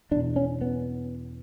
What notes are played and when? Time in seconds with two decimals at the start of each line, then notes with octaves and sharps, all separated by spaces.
0.11 E2 D4
0.16 B2
0.36 C#4
0.61 B3